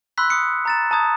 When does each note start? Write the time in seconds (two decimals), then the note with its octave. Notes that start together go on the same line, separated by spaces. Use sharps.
0.18 B5 C6 E6 F#6 B6
0.30 D#6 C#7
0.65 A#5 A6 E7
0.91 A5 A#5 D#6 G#6